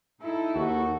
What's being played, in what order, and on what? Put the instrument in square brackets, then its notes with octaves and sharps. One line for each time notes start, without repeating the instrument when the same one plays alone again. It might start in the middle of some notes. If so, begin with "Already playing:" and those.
[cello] D#4 A4 [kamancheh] E4
[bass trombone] D#2 [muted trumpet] F#4